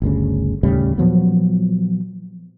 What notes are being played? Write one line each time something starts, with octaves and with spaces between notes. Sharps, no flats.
G1 D2 C#3
D#2 A2 C#3 G3
A#2 F3 F#3 B3